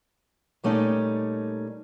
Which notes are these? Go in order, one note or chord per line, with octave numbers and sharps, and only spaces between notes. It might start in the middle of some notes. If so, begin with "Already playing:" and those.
A#2 G3 A3 C#4 D#4 D5